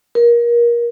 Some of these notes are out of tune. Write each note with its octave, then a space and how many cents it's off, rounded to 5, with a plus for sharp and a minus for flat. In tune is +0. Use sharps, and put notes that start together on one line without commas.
A#4 +25